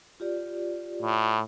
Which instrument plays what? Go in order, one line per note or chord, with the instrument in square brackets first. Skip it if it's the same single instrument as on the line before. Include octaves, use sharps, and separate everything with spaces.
[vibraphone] F4 G4 D5
[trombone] A2